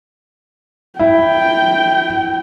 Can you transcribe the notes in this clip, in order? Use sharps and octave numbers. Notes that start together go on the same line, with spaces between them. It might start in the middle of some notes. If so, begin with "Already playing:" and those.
E4 G5